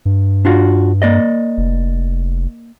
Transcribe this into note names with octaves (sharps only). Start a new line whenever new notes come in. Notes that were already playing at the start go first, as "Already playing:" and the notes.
G2
D4 F4 F#4
A#3 D5 D#5
F1